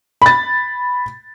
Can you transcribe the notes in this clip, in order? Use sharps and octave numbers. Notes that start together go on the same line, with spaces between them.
B5 A6